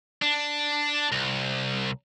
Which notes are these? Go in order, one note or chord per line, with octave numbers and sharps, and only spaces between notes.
D4
C2